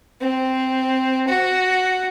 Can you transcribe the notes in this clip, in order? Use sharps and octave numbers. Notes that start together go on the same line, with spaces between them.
C4
F#4